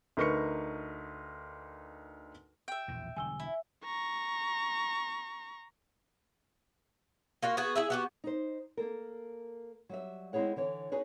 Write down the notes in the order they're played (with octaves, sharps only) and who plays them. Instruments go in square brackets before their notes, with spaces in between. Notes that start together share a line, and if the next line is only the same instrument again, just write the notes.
[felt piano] D2 D#4 A#4 B4 C#6 C#7
[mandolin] E5 G5
[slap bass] A#1 E2 B2
[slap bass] E1 D3 G3 [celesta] G#5 E6 G7
[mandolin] E4
[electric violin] A#5 C#6
[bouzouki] A#3 F4 F#4
B3 F#4 G#4 B4
E4 G#4 E5
B3 F#4 G4
[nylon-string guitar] D#4 C5
A#3 A4 A#4
F#3 G3 E5
G#3 C4 E4 G#4 C#5 F#5
D3 E3 C#5
D#4 F#4 G#4 B4 C#5